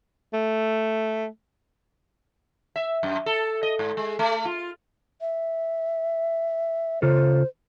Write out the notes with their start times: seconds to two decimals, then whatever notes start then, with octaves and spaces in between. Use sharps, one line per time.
0.34 A3
2.76 E5
3.03 F#2
3.26 A4
3.63 D#5
3.79 G#2
3.97 G#3
4.19 A3
4.45 F4
5.21 E5
7.02 C#3 F4 A4 C5